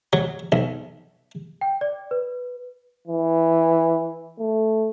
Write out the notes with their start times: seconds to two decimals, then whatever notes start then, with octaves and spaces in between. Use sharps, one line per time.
0.13 F#3
0.52 B1
1.61 G5
1.81 D5
2.11 B4
3.07 E3
4.39 A3